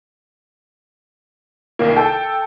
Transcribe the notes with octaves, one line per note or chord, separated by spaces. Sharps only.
C2 D#3 A#3
A4 G5